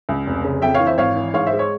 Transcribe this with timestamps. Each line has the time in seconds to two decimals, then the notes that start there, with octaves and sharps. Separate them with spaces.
0.09 C#2
0.26 F1
0.44 C#3
0.62 F2 E5 G5
0.74 C#5 F5
0.80 E3
0.87 C5 E5
0.98 G#1 C#5 F5
1.16 E3
1.34 G#2 C#5 F5
1.47 C5 E5
1.53 G#3
1.59 C#5